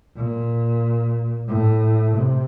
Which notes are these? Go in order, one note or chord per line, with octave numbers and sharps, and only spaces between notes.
A#2
A2
C3